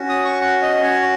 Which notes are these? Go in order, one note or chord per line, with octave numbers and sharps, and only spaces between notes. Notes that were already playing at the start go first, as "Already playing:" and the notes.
Already playing: C#4 F#4
D#6
C#6
F#5
D#5
C#5